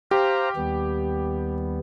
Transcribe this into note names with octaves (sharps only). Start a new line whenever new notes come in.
G4 C5 F5 A#5
D#2 G3 B3